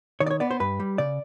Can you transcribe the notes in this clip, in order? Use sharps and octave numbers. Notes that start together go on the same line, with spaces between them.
D#3 C#5
D5
C#5
B3 D5
C5
G2 B4
G3
C#3 D5